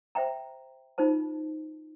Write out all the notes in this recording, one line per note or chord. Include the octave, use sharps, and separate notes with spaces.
C5 E5 G5 A#5
D#4 F4 C5 A5